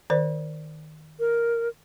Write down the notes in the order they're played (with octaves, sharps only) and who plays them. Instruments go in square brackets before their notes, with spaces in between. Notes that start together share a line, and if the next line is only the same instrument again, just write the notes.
[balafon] D#3 C5 D5
[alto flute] A#4